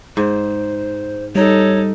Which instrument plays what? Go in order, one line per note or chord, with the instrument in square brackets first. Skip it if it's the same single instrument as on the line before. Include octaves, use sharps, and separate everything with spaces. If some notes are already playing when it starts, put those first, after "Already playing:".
[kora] G#2 [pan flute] C5
[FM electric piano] G3 [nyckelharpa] D#4 A4 [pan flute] C#5